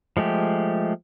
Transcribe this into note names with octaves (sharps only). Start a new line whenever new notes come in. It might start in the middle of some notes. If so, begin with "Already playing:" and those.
F3 G#3 A3 G4